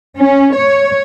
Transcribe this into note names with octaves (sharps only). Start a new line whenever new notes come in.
C#4
C#5